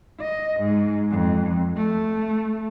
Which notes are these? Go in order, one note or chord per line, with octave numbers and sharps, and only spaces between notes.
D#5
G#2
F2
A3